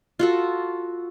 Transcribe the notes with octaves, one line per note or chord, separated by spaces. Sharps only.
F4 F#4 A4